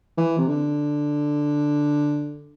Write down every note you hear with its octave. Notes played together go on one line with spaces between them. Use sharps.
E3
C3
D3